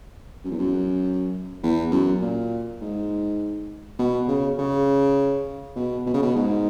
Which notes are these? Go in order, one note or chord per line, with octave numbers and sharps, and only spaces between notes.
F#2
E2
F#2
E2
F#2
A#2
G#2
B2
C#3
C#3
B2
B2
C#3
B2
G#2